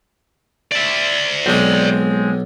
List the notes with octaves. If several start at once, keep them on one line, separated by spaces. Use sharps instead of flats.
D5 E5
B1 G#3 C4 D4